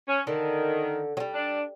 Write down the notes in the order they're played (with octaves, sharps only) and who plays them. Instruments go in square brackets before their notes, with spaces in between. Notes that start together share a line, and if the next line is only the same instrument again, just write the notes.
[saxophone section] C#4
[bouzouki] D3 [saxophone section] D#3
[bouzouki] F#3 G3
[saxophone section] D4